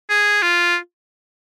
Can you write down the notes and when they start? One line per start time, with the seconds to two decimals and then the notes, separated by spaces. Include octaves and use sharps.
0.09 G#4
0.43 F4